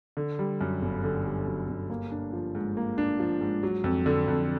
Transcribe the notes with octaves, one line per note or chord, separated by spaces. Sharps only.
D3
G3
F#2
G1
D3
G3
F#2
G1
A#3
D4
F3
G#2
A#3
D4
F3
G#2
F#3
F2
D3
F2